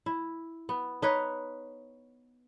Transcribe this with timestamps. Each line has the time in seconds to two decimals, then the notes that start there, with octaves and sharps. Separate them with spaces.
0.06 E4
0.69 B3
1.02 D#4 B4 C#5